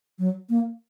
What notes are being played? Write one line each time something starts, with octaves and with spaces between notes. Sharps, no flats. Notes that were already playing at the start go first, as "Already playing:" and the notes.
F#3
A#3